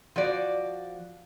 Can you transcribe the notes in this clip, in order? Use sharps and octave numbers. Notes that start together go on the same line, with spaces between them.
F3 F#4 D5